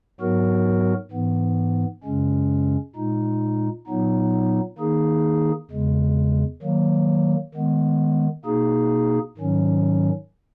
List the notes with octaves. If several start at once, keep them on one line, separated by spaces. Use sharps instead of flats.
G#2 F#3 B3 F#4 A#4
G#2 E3 B3
F#2 C#3 G#3 C#4
A#2 G#3 D#4
A#2 F#3 B3 D#4
D#3 A#3 D#4 G#4
E2 C#3 G#3
D#3 F#3 A#3
D#3 G#3 B3
B2 A#3 D#4 G#4
G#2 D#3 F#3 C#4